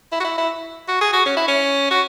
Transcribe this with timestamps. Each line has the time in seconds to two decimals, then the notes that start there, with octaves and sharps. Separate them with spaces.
0.12 E4
0.20 F#4
0.24 E4
0.38 E4
0.88 F#4
1.01 G#4
1.13 F#4
1.26 C#4
1.37 E4
1.48 C#4
1.91 F#4